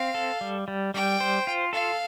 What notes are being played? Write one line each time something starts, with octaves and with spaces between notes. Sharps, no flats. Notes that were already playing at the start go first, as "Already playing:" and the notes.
Already playing: C4 F5
A4
G3
G3
G3 G5
C5
F4
A4 F5